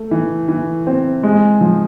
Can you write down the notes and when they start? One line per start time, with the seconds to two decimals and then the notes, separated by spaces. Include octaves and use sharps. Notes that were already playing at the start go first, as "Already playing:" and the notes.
Already playing: A3
0.11 E3
0.48 E3
0.87 C4
1.23 G#3
1.61 F3